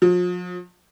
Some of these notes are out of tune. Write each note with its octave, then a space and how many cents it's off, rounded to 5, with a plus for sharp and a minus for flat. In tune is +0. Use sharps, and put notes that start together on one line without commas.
F3 +40